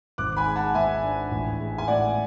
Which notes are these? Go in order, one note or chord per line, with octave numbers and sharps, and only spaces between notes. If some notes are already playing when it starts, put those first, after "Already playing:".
G#1 D6 F#6
G#5 B5
G#3
F#5 A5
G#2 E5 G#5
D4
A1
G#3
G#5
A2 D5 F#5